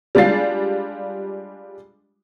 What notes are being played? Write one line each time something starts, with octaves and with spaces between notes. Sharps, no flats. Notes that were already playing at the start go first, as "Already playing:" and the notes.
G3 G#3 D4 F4 A6 C7